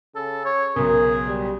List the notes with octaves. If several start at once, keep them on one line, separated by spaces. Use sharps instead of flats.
C#3 A4
C#5
B1 C#3 G#4 A#4
G3